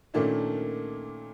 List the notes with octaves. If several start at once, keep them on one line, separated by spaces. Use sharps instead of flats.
A#2 D#3 A3 A#3 C#4 D4